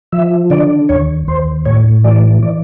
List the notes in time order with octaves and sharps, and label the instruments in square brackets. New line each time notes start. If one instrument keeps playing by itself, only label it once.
[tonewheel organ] F3 E5
D3 D5
D#2 C#5
D#2 C5
A2 C#5
E3 D5
E3 D5